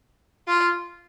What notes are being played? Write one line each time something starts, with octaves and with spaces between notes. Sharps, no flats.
F4